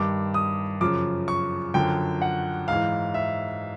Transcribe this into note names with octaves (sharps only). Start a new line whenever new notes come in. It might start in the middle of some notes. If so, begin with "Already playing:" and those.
Already playing: G2 D#3 D6
D#6
F#2 C#3 F3 D6
C#6
F#2 D3 F3 G5
F#5
G#2 E3 F5
E5